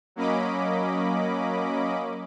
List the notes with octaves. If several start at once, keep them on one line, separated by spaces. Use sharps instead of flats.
F#3 A#3 C#4 D#5 B5 D6